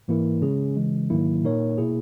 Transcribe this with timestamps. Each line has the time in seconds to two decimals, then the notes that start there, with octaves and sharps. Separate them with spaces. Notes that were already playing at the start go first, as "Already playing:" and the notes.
0.08 G#2 E3 A#3 E4 A#4
0.42 C#3 G#3 C#4 G#4
0.76 C#3 E3 G#3
1.10 G#2 D#3 F#3 A#3 E4
1.44 A#2 A#3 D#4 A#4 C#5
1.78 B2 A#3 E4 G#4